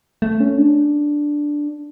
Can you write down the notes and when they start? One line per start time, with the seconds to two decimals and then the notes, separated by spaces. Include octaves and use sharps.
0.22 A3
0.40 C#4
0.57 D4